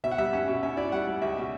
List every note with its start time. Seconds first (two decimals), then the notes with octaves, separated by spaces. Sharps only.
0.04 B2 E5
0.11 F#5
0.18 G3 E5
0.33 C#4 F#5
0.48 B2
0.63 C#4 E5
0.77 E4 D5
0.92 G3 F#5
1.07 G3
1.22 C#2 E5
1.37 B2